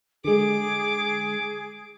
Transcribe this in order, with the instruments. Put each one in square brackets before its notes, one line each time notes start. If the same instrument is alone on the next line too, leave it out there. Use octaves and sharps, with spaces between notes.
[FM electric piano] D3 G#3 [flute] G#4 [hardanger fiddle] D6